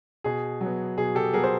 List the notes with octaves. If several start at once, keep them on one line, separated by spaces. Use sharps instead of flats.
B2 G#4
F#3
B3
B2 G#4
G4 A4
F#3 B3 G#4 A#4
C5